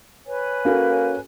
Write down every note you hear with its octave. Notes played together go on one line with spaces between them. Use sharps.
B4 C#5 G#5
A#3 C#4 F#4 A4